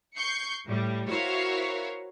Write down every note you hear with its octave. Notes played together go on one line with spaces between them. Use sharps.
C#6 G6 C7 C#7
A2 G3
E4 F#4 A#4 C5 C#5 F5